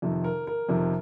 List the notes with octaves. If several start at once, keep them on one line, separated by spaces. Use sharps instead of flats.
F2 C3 D#3
A#4
A#4
F2 C3 D#3